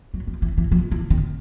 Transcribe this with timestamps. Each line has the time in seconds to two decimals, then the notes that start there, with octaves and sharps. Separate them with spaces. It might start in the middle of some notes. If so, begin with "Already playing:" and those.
0.14 F#3
0.27 F3
0.42 E3
0.58 E3
0.72 F3
0.92 E3
1.10 D#3